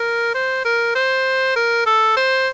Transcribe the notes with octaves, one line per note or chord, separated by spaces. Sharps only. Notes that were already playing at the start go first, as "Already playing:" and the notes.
Already playing: A#4
C5
A#4
C5
A#4
A4
C5